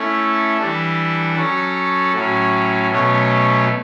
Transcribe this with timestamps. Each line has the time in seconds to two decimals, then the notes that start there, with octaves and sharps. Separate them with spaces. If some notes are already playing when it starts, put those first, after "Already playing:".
Already playing: A3 C#4 E4 A4
0.58 E3 G3 D4 A4
1.35 F#3 C#4 F#4 A4
2.13 A2 F#3 C#4
2.91 B2 F#3 A3 C#4